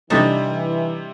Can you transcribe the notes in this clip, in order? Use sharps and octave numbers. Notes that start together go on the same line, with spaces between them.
C3 E3 G3 D4 D#4 A4